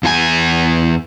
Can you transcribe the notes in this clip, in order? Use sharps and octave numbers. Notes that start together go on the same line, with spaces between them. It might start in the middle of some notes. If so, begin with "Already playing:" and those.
E2 F4 G#5